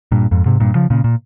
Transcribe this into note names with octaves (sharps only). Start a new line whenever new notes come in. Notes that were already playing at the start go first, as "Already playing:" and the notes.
G2 A#2
F2 G#2
G#2 C3
G2 A#2
C#3 F3
A#2 C#3
A#2